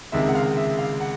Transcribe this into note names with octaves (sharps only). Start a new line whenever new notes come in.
C#2 C3 D#3 G#3 E5
F#5
F5
E5
F5
F#5